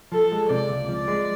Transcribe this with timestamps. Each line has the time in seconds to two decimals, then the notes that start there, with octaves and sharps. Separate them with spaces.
0.12 F3 A4
0.32 G#3
0.50 C3 D5
0.69 C#2
0.89 F3 D5
1.08 G#3